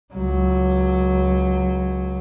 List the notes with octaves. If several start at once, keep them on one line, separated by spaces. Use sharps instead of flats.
C#2 F#3